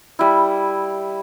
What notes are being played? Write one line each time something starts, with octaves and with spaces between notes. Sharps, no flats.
G3 E4